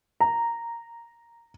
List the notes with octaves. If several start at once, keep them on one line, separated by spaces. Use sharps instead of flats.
A#5